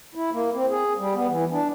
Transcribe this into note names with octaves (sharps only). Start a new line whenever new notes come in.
E4
A#3
C4
G#4
G3
B3
E3
D4